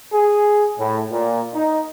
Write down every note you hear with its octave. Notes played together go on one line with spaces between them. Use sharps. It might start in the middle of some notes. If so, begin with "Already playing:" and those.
G#4
A2
A#2
D#4